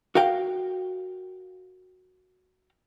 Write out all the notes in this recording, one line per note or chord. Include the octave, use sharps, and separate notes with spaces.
F#4 A#4 F5 G5